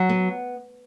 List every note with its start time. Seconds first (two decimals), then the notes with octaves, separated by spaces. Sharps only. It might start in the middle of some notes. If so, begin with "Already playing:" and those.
Already playing: F#3
0.09 B3